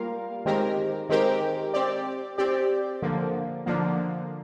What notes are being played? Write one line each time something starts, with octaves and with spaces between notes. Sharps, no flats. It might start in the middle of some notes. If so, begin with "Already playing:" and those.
Already playing: G3 A#3 F4 A#4 F5
D#3 G#3 C4 G4 A#4
D#3 G#3 C4 G4 A#4
C4 G4 D5
C4 G4 D5
D3 F3 A#3
D3 F3 A#3